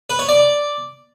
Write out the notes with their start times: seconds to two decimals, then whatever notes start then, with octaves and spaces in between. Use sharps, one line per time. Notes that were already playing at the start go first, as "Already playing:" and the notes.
0.10 B4
0.19 C#5
0.29 D5